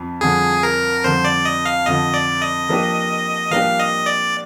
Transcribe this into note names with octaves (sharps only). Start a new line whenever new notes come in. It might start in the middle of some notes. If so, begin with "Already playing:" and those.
Already playing: F2 F3
F2 D3 F3 G#4
A#4
F2 D3 F3 C5
D5
D#5
F5
F2 D3 F3 D#5
D5
D#5
F3 A#3 D4 G4
F3 A#3 D4 G4 F5
D#5
D5